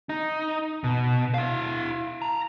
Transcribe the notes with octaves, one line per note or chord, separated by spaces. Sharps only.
D#4
B2
E4 F5
A5 A#5